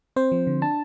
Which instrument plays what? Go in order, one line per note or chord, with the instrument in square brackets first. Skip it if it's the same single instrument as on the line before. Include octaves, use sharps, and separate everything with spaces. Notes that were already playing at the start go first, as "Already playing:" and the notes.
[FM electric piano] C4 C5
F3
D3
D4 A5